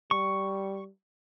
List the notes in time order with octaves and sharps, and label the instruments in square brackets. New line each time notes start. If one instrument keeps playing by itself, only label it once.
[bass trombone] G3 [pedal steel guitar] C#6